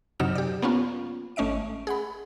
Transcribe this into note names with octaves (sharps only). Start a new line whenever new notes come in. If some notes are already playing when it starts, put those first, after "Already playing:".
F#2 C3 F#3 D#4 F6 E7
G4 D5
A#3 B3 C#4 F4
G#1 A3 C#4 D#5 E5 D7
G#4 F#5 B5